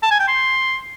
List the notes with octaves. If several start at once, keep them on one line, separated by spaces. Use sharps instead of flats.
A5
G#5
G5
C6